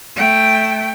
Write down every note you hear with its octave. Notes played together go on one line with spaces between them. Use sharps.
A3 G5